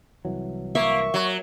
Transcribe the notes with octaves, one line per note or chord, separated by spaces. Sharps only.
C2 E3 F#3
A#3 E5 C#6
F#3